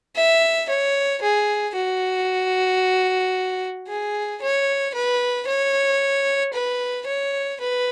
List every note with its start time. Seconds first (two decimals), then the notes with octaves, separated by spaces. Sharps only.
0.16 E5
0.69 C#5
1.22 G#4
1.75 F#4
3.88 G#4
4.41 C#5
4.94 B4
5.47 C#5
6.53 B4
7.07 C#5
7.60 B4